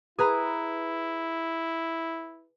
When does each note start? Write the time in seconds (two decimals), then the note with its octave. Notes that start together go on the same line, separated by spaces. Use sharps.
0.19 E4 G#4 B4 A#5